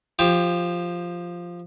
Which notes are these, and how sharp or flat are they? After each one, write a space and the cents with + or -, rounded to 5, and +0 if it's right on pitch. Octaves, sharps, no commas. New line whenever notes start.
F3 +0 G4 +15 D6 -25